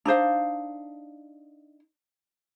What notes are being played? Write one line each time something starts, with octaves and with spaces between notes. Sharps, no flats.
D4 D#4 C5 F5